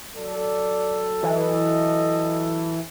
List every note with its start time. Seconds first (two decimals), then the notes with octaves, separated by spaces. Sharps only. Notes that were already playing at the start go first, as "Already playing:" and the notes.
0.16 F#3 A4 D5
1.23 E3 D#5